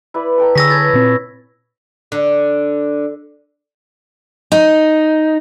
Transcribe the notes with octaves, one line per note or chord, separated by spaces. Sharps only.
E4 B4 D5
A4 G5 A#5
D3 G#4 C#5 G#5 E6 A#6 B6
A4 B4 C#5 G#6 A6
A#2 C4
D3
D#4